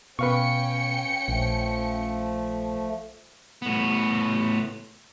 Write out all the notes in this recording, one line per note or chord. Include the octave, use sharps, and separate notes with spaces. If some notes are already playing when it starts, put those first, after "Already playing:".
B2 C#4 B4 F5 G5 C#6 C#7
A#1 F3 A3
A2 B3